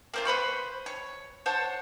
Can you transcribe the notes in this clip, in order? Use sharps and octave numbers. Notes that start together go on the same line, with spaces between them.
A#3 C4 F4
B4 C5 B5 C#6
C#5
C5 C#5 F#5 A5